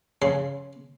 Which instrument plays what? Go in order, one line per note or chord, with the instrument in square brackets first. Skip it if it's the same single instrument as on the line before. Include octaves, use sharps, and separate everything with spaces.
[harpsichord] C#3 C6